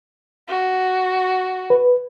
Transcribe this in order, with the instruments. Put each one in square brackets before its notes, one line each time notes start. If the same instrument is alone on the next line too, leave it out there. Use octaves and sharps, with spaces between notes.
[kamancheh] F#4
[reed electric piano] B4